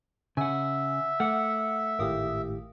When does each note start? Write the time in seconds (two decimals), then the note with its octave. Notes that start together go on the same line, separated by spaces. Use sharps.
0.37 C#3 E5 F#5 G#5
1.20 A3 F#5 D6 F6 C#7
1.99 G#1 A2 G4 A#4 F5 D#6